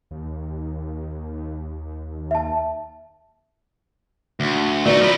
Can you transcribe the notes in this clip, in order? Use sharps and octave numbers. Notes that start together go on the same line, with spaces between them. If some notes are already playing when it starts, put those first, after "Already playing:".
D#2
E5 A5
D2
A3 B3 D#4 F#4 D5
F3 E4